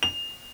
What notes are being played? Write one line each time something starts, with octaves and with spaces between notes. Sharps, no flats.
F7